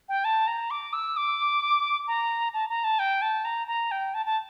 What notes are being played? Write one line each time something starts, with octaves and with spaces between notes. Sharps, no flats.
G5
A5
A#5
D6
E6
D6
A#5
A5
A#5
A5
G5
A5
A#5
A#5
G5
A5
A5